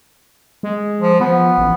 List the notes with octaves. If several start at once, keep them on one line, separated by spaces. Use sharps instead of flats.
G#3
F3
F3 B3
A1